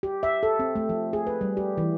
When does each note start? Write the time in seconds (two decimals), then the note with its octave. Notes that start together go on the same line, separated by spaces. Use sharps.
0.03 G4
0.23 E5
0.43 A4
0.59 C4
0.76 A3
0.89 F3
1.13 G#4
1.27 B4
1.41 G3
1.57 G4
1.78 E3